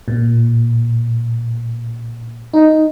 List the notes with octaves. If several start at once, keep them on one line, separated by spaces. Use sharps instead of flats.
A#2
D#4